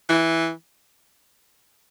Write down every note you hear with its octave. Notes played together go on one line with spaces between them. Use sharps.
E3